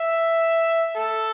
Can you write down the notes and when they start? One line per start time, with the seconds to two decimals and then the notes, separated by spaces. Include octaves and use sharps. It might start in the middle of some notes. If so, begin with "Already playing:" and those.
Already playing: E5
0.96 A4